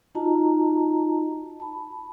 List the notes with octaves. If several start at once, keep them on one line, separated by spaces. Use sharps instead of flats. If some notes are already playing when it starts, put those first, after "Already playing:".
D#4 F4 F#4 D#5 A5 A#5
A5 B5